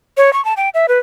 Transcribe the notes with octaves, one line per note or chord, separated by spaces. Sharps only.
C#5
C#6
A5
G5
E5
B4